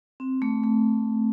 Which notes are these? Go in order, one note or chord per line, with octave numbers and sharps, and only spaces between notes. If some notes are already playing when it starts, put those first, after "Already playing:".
C4
A3
A3